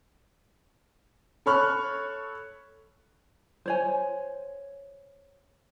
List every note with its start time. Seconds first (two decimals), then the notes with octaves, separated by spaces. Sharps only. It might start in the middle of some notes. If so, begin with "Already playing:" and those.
1.46 A4 C#5 B5 C#6 F6 F#6
3.66 C5 C#5 G#5